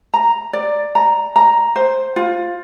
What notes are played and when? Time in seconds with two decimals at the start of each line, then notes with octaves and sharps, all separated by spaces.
0.14 A#5
0.53 D5
0.95 A#5
1.36 A#5
1.76 C5
2.16 F4